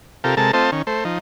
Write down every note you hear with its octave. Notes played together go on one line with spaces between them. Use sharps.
C3 F4 G4 A4 A#4
C3 G#3 A4 A#4 A5
A3 C4 F4 C5 D#5 A5
D#3 C#4
A3 C5
F3 D#4